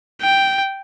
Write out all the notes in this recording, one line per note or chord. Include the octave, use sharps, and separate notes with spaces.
G5